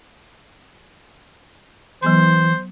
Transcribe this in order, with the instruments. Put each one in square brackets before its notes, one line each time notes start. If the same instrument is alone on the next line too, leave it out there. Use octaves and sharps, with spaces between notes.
[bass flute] E3 [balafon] F#3 B3 C6 [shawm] C5